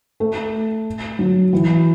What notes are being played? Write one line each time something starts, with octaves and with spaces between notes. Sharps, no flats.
A3
F#3
E3